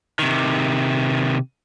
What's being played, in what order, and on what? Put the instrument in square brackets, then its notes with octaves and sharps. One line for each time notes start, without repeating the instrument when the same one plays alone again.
[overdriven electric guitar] C3 D#3